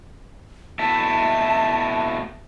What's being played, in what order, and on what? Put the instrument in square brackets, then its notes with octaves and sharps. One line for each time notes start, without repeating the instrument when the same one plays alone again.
[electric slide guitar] B2 A3 E4 [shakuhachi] A5